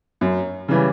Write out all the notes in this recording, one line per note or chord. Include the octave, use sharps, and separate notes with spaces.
F#2
C#3 E3 G3